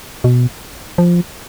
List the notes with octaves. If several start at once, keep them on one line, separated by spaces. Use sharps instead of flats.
B2
F3